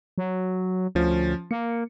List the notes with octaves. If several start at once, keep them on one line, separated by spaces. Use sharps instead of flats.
F#3
D2 F3 C#4
A#3 C#7